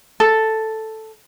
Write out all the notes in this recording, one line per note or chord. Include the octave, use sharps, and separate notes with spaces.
A4